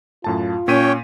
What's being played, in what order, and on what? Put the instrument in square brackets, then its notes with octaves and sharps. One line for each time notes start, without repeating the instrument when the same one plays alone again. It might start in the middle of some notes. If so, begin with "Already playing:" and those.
[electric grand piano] F#2 A2 A5 [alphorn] F4
[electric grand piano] A#2 B6 D#7 [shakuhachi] C#4 [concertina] C#5 G5